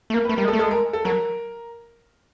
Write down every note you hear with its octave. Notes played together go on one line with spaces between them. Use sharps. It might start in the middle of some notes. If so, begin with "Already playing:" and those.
A3
A#3 A#4
B4
A3
G3 A#4
G#3
A4
A3
G#3 A4
A#4
A4
F#3 A#4